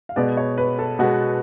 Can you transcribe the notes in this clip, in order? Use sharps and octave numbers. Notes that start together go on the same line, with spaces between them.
F5
B2 G#3 B3 D5
C#5
B4
A4
B2 G#3 B3 F#4